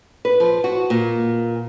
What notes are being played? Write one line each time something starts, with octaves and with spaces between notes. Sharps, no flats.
B4
F3
F#4
A#2